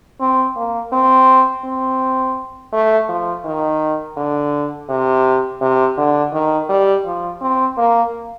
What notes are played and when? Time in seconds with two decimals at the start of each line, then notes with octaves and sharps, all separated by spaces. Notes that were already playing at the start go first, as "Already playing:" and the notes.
0.20 C4
0.56 A#3
0.92 C4
1.64 C4
2.73 A3
3.08 F3
3.44 D#3
4.17 D3
4.89 C3
5.61 C3
5.97 D3
6.33 D#3
6.69 G3
7.05 F3
7.41 C4
7.78 A#3